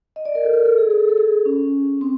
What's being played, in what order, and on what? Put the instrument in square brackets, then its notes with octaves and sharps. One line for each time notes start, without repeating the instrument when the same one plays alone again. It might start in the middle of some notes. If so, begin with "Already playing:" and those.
[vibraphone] D#5
D5
A#4
A4
A#4
A4
G#4
G#4
A4
A4
G#4
C#4
C4